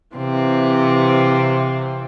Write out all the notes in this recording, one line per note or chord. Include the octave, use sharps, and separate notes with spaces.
C3 E3 C4 F4